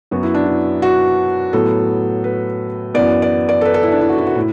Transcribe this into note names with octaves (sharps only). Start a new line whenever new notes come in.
F#2 F#3 B3 F#4
E4
D4
E4
F#4
A2 F#3 B3 A4
B4
F#2 E3 B3 D5
D5
D5
A4
B4
A4
E4
D4
E4
F#4
E4
F#4
A2 E4